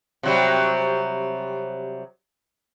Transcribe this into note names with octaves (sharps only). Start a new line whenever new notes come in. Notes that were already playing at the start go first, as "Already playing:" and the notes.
C3 F#3 G3